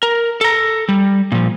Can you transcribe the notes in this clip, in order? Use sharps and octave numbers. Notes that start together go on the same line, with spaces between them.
A#4
A4 A#5
G3
A#2 F3